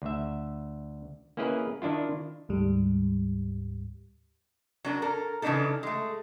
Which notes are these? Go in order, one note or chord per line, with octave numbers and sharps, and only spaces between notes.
D2 E5
A#3 C#4 E4 G#4 B4 D#5
D#3 D4 E4 F4
D2 G#2 G3
F#3 D4 A#4
A4 A#4
C#3 E3 G#3 D4 D#4 A4
G#3 A3